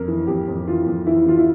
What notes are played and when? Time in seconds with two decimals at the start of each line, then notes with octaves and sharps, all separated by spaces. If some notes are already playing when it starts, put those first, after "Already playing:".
Already playing: F2 A#4
0.08 E3
0.27 F2 G4
0.48 F2
0.68 E3 F4
0.86 F2
1.06 E3 E4
1.26 E3 F4
1.38 E4